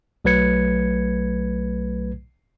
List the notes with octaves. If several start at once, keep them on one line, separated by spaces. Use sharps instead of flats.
B1 F#3 A3 B4 G#6 C#7